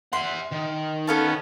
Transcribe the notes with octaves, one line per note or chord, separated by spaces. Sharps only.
E5 F#5 C6
D#3
B3 C#4 A4 F5 A5